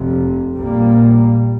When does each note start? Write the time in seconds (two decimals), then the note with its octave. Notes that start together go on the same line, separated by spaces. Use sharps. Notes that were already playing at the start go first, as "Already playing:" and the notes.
Already playing: F1 F2 C3
0.55 A#1 A#2 G3 A#3